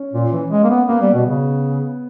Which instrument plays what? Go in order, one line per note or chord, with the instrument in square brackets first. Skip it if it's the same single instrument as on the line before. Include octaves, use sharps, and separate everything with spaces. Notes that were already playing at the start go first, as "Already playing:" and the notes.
Already playing: [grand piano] C#4
[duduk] A#2
E3
G#3
A#3
B3
[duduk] A#3 [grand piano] B3
[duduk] G3
B2
C#3